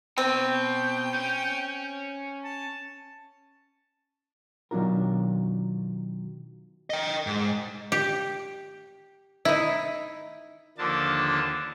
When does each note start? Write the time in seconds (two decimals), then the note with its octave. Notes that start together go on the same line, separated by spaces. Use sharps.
0.18 B2 C4 G5
1.15 C#4
2.44 A5
4.71 B2 D#3 F#3 D4 F4 A#4
6.90 D#5 G5
7.27 G#2
7.92 G4
9.45 D#4 E4
10.78 D#2 D3 F3 A#3 D4 A5